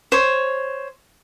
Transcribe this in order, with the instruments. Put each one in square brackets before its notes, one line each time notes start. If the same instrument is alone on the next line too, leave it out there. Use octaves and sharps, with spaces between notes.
[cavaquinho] C5 C#5